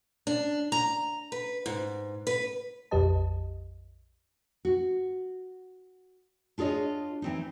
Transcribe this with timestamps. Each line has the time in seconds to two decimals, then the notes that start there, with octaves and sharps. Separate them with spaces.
0.27 D4
0.72 A#5
1.32 B4
1.66 G#2
2.27 B4
2.91 A#1 F2 G4 B4 D#5 A5
4.65 F#4
6.58 D4 F4 G#4 C#5 D#5
7.22 E3 C4 D#4